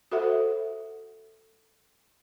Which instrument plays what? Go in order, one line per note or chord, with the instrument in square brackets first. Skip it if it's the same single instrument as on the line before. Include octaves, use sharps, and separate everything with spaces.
[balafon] F#4 A4 C5 E5 F#5